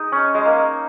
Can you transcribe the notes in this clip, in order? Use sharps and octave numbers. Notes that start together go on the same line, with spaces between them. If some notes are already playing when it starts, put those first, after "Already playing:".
Already playing: G#3 D#4
C#4
G#3
A#3